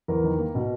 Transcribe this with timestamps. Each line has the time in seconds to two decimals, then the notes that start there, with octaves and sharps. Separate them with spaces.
0.08 E2 A#4
0.24 D#3
0.38 A#3
0.55 B2